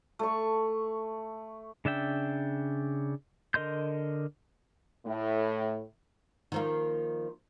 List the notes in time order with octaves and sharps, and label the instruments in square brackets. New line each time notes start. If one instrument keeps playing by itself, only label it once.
[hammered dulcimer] A3 A5 C#6
[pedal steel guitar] C#3 D4 E5 G5
D3 A#4 D#5 C6 G6
[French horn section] A2
[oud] D#3 F3 A#3